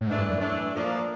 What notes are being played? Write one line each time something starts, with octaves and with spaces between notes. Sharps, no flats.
A2
G#2 E3 A3 D4
G2
F#2
E3 A3 D4
A#2 F3 A#3 D4